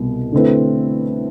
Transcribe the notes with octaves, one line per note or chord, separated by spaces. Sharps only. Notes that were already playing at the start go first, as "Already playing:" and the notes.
Already playing: C2 B2
D3 A3 C4 E4 B4